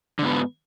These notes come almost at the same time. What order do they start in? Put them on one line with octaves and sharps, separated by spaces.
D3 G#2 B3